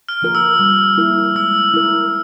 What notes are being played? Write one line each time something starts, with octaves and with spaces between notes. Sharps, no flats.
F6
F3 A#3 F4 A#4
E6
G3
A#3 E4 A#4
G#3 E6
E4 A#4